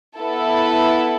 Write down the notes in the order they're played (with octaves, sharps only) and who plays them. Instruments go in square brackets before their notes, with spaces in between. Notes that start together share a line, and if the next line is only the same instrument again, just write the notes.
[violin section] B3 E4 A4